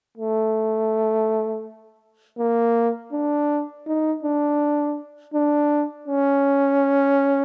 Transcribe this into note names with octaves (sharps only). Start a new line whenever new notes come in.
A3
A#3
D4
D#4
D4
D4
C#4